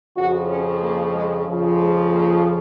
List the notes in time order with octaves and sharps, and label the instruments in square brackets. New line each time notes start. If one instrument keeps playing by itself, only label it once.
[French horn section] F2 C#3 F3 F#4
C#4
A#3
G#3
F2 C#3 F3
G#3
A#3